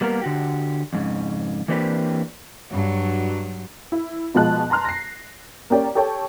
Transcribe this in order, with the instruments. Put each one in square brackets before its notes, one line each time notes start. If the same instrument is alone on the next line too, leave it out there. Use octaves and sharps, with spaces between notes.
[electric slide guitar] G3 A#3 B3 A#4
D3 F#4 G4
F2 G#2 C#3
E3 A#3 C4 D4 G4 B4
[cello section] G2 F#3
[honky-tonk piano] E4
B2 F3 G#3 A5 F#6
A5 A#5 C6 F6 F#6
A#6 C7
A#3 C#4 G4 D5
G4 A4 C#5 G5 A5